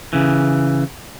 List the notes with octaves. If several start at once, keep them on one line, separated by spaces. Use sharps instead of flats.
C#3 E3